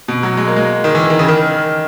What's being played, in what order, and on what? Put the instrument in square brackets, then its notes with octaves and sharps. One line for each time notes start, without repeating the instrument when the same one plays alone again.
[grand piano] B2
F#3
G#3
A#3
G#3
D#3
E3
D#3
C#3
D#3